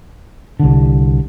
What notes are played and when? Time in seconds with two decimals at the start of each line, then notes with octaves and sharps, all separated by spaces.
0.59 C2 D3